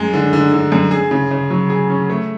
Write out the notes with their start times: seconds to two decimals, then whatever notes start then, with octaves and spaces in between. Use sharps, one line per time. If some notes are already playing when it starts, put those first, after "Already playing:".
Already playing: F#2 G#3
0.13 D3
0.33 D3
0.52 D3
0.72 F#2
0.91 G#4
1.11 C#3
1.31 C#3
1.50 F#3
1.70 G#4
1.90 C#4
2.10 A3